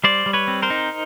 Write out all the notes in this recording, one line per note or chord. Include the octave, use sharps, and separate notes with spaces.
G3 C5 D5
G3
B4 C#5
C4
A#4 C5
D#4